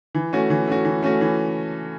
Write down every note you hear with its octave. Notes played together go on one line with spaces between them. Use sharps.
E3
A3 C#4 F#4
E3
A3 C#4 F#4
E3
A3 C#4 F#4
E3